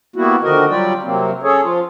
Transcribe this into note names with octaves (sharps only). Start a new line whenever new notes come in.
G3 A#3 B3 E4 F#4
D3 D#3 F3 F#4 A#4 D#5
F#3 G3 F4 G4 D5 G5
C3 F#3 A#3 C4
C#4 G#4 A4 C#5
F3 F4